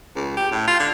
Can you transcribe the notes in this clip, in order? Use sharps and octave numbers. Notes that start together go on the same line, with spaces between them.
C#2
G4
A2
F4
D3